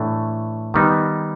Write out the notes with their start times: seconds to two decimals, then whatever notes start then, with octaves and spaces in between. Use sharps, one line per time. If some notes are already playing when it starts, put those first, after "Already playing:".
Already playing: A2 E3 A3 D4
0.74 D#3 G3 B3 D#4